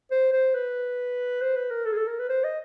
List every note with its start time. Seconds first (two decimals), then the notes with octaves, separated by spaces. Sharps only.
0.11 C5
0.32 C5
0.55 B4
1.42 C5
1.56 B4
1.71 A#4
1.85 A4
1.92 G#4
1.97 A4
2.07 A#4
2.19 B4
2.29 C5
2.44 D#5